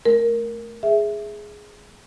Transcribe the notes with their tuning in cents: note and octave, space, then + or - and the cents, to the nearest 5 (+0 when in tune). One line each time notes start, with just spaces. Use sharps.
A3 -15 A#4 +0
G#4 +0 E5 +0